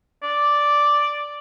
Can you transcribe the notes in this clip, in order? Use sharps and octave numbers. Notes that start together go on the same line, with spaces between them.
D5